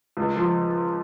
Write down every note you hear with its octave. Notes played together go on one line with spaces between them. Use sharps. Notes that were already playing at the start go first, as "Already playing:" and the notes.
C#2
F3